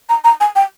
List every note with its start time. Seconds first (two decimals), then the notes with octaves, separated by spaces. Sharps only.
0.09 A#5
0.24 A#5
0.40 G#5
0.56 G5